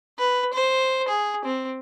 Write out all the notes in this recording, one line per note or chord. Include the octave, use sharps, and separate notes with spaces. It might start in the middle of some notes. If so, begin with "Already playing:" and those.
B4
C5
G#4
C4